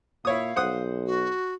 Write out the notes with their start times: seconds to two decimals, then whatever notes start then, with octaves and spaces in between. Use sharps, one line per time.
0.25 A#2 E4 C#5 F5 D#6
0.56 B1 C5 F#5 D#6
1.06 F#4